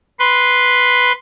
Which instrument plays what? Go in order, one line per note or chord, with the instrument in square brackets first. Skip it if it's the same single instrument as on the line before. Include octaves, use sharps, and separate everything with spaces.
[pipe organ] B4 C6